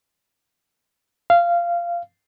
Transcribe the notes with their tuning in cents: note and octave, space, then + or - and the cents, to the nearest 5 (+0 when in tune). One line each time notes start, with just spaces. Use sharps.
F5 -15